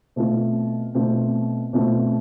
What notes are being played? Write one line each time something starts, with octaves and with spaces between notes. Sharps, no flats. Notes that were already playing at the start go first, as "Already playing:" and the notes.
B2 A3 C4 F4
B2 A3 C4 F4
B2 A3 C4 F4